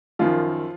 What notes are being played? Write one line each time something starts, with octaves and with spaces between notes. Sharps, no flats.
F#2 D#3 F3 F4